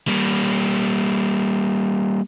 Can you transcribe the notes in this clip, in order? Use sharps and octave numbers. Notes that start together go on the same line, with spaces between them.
G3 A#3